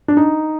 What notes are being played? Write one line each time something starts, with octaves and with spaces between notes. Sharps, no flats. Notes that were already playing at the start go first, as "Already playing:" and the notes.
D4
D#4